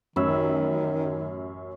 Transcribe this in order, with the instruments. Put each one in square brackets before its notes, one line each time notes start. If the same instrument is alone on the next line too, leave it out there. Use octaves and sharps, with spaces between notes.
[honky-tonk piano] A1 F#2 E6 [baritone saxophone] D#3 [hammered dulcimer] C#5 B5